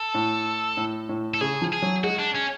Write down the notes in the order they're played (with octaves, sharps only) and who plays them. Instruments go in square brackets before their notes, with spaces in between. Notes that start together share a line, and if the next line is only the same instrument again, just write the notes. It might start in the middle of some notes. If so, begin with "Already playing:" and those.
Already playing: [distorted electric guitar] A4
[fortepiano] A2
A2
A2
[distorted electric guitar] A4
[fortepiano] C#3 [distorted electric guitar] G#4
[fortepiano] F3
[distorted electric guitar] G#4
[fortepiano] F#3
[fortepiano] G#3 [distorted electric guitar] F#4
[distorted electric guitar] D4
C#4